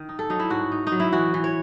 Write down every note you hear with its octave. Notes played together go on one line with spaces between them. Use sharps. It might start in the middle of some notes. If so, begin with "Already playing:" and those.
Already playing: D#3
D#4
A4
F#3 D#4
E4
G#2 F#4
D#4
D#4
F#3
E4
E3 F#4
E3
C#5